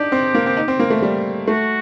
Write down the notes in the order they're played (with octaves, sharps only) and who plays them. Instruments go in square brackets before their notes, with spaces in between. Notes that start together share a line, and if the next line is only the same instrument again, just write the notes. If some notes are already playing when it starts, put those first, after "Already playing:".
Already playing: [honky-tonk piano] D4 D#4 [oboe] G4
[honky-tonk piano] C4
A#3
C4
D#4
C4
A#3
A3
G3
[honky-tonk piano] A3 [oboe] F#4